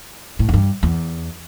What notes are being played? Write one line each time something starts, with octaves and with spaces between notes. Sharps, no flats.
A2
E2
G2
E2